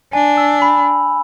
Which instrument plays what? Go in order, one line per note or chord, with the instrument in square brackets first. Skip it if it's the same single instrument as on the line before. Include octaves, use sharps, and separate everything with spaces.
[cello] D4 [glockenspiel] G#5
[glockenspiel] E6
B5